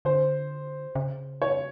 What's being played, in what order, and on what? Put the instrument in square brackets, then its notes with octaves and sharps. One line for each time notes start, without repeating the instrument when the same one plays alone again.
[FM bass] D3 [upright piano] C5
[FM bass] C#3
[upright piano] C#5